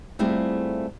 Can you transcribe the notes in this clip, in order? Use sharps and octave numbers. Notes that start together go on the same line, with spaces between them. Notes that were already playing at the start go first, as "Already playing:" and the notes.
G3 A3 C4 E4 F4 G#4